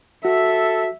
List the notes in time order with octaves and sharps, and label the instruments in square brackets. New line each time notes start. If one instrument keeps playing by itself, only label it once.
[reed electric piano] F#4 [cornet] A4 [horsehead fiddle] E5